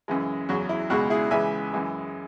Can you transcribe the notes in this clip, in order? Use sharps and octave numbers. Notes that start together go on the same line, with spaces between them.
F#2 C#3 E3 G#3
E2 C#3 F#3 F#4
E4
C#2 B2 G#3 F#4
E4 G#4
C#2 C#3 E3 G#3 E5 G#5
F#2 E3 G#3